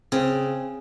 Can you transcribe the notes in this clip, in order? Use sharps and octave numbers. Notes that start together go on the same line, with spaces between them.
C#3 C4